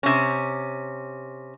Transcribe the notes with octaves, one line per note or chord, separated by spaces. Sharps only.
C3 C#4